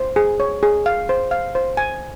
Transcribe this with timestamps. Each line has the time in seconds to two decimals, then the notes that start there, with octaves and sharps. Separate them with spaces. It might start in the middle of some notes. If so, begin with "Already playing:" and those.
Already playing: C5
0.16 G#4
0.40 C#5
0.63 G#4
0.86 F5
1.09 C5
1.31 F5
1.55 C5
1.77 G#5